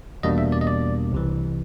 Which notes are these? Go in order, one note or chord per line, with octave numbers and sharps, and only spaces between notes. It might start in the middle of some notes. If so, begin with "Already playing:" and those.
E2 B2 G3 A#3 D4 D#5
E5
D5
D#5
D5
C2 C3 E3